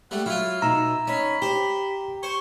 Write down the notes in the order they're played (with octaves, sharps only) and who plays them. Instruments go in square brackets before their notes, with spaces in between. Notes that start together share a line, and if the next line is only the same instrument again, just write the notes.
[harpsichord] G3 A3 [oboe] F#5
[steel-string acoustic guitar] F#3 [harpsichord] E4 F4 [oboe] F5
[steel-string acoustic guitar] B2 D#4 [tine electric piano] A#5 [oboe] E6
[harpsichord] C#4 [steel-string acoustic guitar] D#4 [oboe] B5
[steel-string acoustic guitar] G4 [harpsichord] C5
[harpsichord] C5 [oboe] C#6